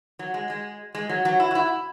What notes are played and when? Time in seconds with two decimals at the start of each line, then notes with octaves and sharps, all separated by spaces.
0.19 F#3
0.34 G#3
0.50 G#3
0.95 G#3
1.09 F#3
1.25 F#3
1.40 E4
1.51 F#4
1.55 E4